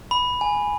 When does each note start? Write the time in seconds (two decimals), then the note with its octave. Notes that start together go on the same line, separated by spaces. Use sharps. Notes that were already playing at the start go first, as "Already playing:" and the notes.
0.11 B5
0.41 G#5